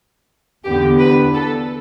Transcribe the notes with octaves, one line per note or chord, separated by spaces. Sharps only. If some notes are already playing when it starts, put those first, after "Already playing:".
E2 D3 B3 G4
B4
A4